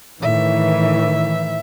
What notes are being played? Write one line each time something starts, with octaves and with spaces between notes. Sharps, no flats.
A2 D#3 E3 E5